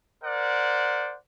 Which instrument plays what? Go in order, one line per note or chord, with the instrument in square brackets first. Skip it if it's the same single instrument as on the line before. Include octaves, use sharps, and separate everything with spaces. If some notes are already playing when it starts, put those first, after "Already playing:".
[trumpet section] A#4 C5 D5 F#5